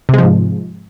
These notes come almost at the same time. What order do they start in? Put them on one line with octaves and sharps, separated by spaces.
C3 G#3 F3 G#2